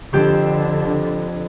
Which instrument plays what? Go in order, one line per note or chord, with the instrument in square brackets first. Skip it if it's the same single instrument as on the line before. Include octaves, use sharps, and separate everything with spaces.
[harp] F2 G4 C6 [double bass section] D3